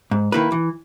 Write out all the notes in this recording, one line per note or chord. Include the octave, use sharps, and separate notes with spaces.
G#2
D#3 A#3 E4 B4
E3